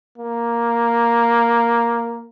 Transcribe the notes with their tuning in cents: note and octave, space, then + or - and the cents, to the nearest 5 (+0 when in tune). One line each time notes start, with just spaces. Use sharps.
A#3 +5